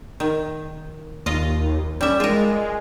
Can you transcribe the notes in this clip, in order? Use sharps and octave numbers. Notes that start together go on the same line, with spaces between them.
D#3
D#2 F4 D#5
G3 C#4 E5
G#3 F4 A#4